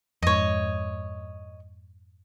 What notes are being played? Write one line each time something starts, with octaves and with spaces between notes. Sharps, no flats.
F2 G#2 C#5 D#5